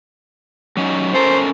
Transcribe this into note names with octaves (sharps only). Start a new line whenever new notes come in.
F#3 C#4 D#4
C#4 A4 A#4 C5